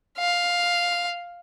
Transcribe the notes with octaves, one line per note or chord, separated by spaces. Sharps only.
F5